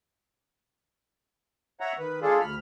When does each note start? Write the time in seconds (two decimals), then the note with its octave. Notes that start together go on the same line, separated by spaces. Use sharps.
1.80 C#5 E5 F#5 A#5
1.99 D#3 B4
2.22 G#3 D4 F4 G#4 A4
2.40 D2 B5 F6